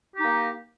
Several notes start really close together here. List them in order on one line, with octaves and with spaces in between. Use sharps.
G4 D#4 A#3